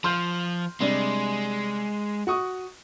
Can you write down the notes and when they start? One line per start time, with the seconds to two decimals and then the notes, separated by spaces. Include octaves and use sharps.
0.04 F3 C6 F6 G6
0.80 C3 G3 G#3 D4
2.27 F#4 C#6 D#6